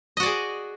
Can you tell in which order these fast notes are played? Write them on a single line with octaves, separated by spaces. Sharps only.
D#5 F#4 D5 G#4